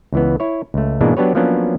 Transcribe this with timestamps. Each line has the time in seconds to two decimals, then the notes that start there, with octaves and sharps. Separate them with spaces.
0.13 C#2 E3 B3
0.40 E4 C#5
0.74 C#2 A3
1.01 G#2 B2 E3 G#3 A#3 D4
1.17 F#3 B3 D4 G4 B4 C#5
1.35 F3 F#3 A#3 B3 C#4 D4